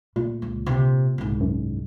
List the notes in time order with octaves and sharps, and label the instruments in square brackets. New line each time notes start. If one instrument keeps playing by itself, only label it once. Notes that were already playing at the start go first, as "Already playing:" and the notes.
[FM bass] A#2 [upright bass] A3
[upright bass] C#2
C3
C2 G#2
[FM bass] F#2